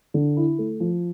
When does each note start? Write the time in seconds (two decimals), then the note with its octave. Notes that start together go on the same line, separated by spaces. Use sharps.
0.14 D3
0.37 E4
0.59 A3
0.80 F3